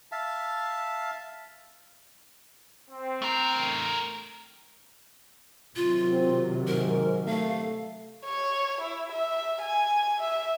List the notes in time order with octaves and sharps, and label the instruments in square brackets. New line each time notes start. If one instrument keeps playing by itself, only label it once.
[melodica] E5 F5 A5
[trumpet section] C4
[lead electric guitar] A3 A#4
[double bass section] C3 D#3 F#3 [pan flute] F4
[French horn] C4
[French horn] G#2 [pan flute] A#4
[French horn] A3 [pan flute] F5
[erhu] C#5
E4
E5
G#5
E5